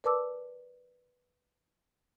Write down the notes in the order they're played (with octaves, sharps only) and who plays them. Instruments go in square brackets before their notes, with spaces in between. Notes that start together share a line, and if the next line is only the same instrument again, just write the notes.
[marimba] A#4 B4 D5 A5 D6 E6